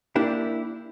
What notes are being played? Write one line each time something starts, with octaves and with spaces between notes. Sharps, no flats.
A#3 D4 E4 G4